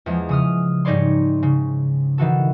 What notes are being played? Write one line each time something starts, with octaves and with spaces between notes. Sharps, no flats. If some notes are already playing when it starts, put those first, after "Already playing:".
E2 F3 G#3
C#3 D#6 F6
G#2 G3 D#4 C#5 D5 C6
C#3
D#3 E3 F#4 A4